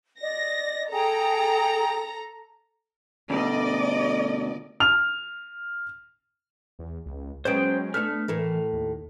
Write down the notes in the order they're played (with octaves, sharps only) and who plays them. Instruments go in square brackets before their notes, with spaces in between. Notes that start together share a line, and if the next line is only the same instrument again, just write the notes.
[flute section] D5 D#5 [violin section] A#6
[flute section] G#4 G5 [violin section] A4 A#5
[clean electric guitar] D2 B2 [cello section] D5 D#5
[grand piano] F6 F7
[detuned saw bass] E2
C#2
[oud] F#3 G#3 B3 [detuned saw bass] C#4 [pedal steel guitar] C5 G5
[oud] A3 B3 D4 [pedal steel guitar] F6
[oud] A2 A4 A#4 [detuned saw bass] E3
[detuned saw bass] D#2